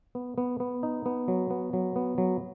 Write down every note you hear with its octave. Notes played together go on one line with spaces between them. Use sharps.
B3
B3
B3
D#4
B3
F#3
B3
F#3
B3
F#3